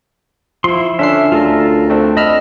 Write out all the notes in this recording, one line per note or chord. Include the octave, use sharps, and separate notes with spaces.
F3 E4 C6
D3 C#4 D4 E5 C7
D2 F4 A4 A#4
A3 C4 D4
D#5 B5 E6 F6